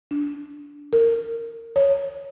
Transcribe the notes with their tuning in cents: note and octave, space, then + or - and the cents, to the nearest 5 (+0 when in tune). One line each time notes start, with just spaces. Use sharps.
D4 -15
A#4 -20
C#5 +0